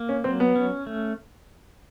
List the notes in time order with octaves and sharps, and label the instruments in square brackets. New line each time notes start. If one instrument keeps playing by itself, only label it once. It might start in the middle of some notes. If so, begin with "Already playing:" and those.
Already playing: [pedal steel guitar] A#3
[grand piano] C#4
[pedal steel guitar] F#3 [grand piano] C4
[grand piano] B3
[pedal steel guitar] C#4
A3